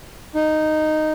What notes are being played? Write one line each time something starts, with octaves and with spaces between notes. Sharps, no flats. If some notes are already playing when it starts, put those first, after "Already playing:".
D#4